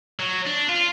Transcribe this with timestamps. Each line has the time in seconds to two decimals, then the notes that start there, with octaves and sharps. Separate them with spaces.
0.19 F#3
0.46 D4
0.69 F4